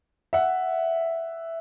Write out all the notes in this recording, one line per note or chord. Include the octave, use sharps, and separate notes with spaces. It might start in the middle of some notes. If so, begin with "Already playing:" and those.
E5 F#5